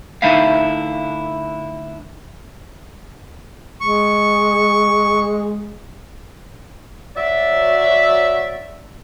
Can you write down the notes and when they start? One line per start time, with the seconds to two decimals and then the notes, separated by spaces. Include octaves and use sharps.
0.22 D3 A3 D#4 E4 E5 F5
3.81 G#3 C#6
7.16 F#3 D5 E5